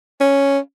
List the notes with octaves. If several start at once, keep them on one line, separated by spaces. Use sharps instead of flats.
C#4